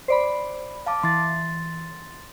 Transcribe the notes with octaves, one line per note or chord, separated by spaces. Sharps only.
C5 D5 B5
F5 A5 D6
E3 C6 A6